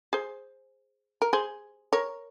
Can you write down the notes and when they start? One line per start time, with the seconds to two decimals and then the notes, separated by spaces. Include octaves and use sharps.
0.13 G#4 C5
1.22 A#4
1.33 G#4 C5
1.93 A#4 C#5